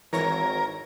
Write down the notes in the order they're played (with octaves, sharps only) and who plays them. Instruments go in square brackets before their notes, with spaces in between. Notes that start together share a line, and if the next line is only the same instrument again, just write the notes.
[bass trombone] G#1 [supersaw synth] E3 C#5 A#6 [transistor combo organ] A#4